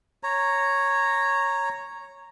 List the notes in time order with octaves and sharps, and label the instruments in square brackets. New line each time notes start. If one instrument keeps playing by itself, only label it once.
[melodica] C#5 A#5